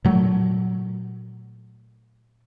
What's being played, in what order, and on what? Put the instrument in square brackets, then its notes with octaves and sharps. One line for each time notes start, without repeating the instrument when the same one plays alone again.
[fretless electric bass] A#2 F#3 A3